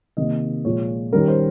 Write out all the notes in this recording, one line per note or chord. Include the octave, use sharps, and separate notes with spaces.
C3 D#3 A#3 D#5
A#2 F3 G#3 C#5
D#3 G3 C#4 A#4
C5